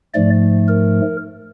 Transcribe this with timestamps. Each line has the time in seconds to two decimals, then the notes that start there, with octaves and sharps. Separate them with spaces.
0.14 G#2 F3 A3 D5
0.68 A#4